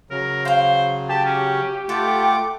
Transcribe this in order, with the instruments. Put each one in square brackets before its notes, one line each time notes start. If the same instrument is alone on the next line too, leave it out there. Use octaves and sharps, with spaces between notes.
[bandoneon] C#3 F#3 [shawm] A#4
[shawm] C5 [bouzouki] F5 G5
[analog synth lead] G4 [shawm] A5
[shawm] C#4
[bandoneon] A3 F4 F#5 [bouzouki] A4 [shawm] D6